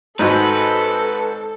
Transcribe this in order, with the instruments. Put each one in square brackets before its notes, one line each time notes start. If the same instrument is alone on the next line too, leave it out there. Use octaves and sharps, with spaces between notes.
[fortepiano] G#1 [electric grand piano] D#4 F#4 [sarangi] A4 [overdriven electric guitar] B4